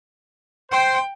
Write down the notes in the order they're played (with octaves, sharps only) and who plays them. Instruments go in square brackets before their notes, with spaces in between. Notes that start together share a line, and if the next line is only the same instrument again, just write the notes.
[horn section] C5 [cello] G5